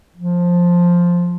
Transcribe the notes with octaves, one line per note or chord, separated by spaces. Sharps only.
F3